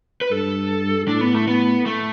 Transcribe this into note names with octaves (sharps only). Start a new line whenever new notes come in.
B4
G2 A4
A2 D4
B3
A3
B3
A3